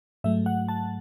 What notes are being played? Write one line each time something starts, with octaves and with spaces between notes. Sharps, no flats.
G#2 F#3 A3 E5
F#5
A5